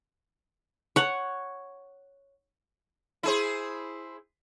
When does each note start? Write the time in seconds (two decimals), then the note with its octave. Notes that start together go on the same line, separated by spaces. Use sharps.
0.96 C#5 F#5
3.23 E4 G#4 C5